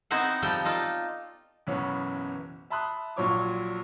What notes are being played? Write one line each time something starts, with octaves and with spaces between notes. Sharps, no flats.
B3 C4 D#4 E4 C5 F#5
F3 G3 A4 G5
D#4 F4 A4 D5
F#1 B1 C#3 E3 B3 C#5
E5 A5 B5 C6 D#6 F#6
A#1 A#2 F#3 C#5 C#6 D6